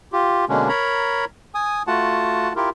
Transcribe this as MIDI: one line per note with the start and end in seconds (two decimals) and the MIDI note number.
0.13 0.45 65
0.13 0.45 67
0.49 0.69 47
0.49 0.69 50
0.49 0.69 56
0.49 0.69 58
0.49 0.69 61
0.49 0.69 62
0.69 1.25 70
0.69 1.25 73
0.69 1.25 82
0.69 1.25 83
1.55 1.83 80
1.55 1.83 87
1.87 2.53 57
1.87 2.53 65
1.87 2.53 66
1.87 2.53 78
1.87 2.53 81
2.56 2.70 64
2.56 2.70 65
2.56 2.70 67
2.56 2.70 70